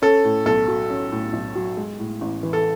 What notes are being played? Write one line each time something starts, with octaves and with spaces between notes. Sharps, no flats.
C#4 A4
A2
B1 A4
F#3
C#4
A2
B1
F#3
G#3
A2
A1
E3
A4